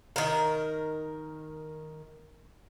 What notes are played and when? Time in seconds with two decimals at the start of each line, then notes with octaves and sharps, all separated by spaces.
0.16 D#3 A#4